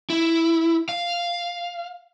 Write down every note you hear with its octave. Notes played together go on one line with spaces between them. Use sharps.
E4
F5